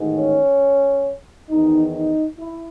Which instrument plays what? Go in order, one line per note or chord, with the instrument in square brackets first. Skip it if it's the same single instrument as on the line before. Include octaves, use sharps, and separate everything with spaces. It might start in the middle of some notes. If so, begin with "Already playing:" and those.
Already playing: [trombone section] A1 G#2 D#3
C#4
E2 D#3 D#4
D#4
E4